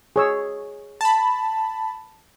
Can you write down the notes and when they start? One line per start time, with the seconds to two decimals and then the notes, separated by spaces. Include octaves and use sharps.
0.16 G#4 C#5 E6
1.01 A5 B5